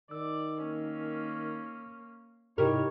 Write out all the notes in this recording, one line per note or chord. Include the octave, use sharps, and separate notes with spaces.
D#3 D5 E6
A#3 C#4
G#2 C3 G3 D#4 E4 A#4 C#5